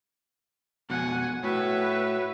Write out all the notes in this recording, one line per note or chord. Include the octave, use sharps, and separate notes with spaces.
F2 B2 F#5 G#5
A2 F#4 B4 C#5 E5